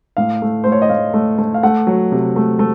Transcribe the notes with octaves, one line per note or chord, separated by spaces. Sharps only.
A2 F5
A3
A3 C5
C#5
D#5
A2 F5
A3
A3
F5
A3 F#5
F#3
C3
A3
A3